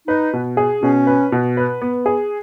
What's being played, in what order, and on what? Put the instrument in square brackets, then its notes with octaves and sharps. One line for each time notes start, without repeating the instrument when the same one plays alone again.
[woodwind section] D#4 [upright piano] B4
[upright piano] B2
G#4
[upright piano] B2 [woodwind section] C#4
[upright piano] B4
B2
B4
B3
G#4